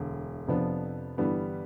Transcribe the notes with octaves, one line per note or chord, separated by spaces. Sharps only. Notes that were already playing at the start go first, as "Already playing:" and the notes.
Already playing: E1 D2 D3
F2 C3 F3 B3 D4
G1 G2 E3 G3 B3